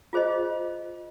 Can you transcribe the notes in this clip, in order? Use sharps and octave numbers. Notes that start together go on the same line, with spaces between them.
F4 G#4 C5 D#5